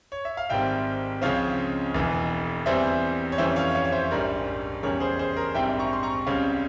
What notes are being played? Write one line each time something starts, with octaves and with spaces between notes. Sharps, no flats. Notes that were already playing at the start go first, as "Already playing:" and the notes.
C#5
E5
F5
G#1 G#2 G3 C4 E5 G5
C#2 C#3 F3 C4 C#5 F5
E1 E2 E3
E2 E3 G3 C4 C5 E5
C#5
F2 E3 G3 C#4 C5 E5
C#5 F5
C#5 F5
C#5
C5 E5
A#1 G#2 G3 C#4 A#4
E2 C#3 G3 C#4 A#4 C#5
G#4 C5
G#4 C5
A#4
A#1 G#2 G3 C4 E5 G5
A#5 C#6
C6
A#5 C#6
C#2 C#3 G3 C4 C#5 F5